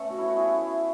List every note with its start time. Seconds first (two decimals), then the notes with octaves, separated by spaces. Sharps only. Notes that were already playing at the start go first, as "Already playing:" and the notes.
Already playing: A3 B3 C#4 A4
0.10 F#4
0.18 E4
0.28 F#4
0.37 E4 G#4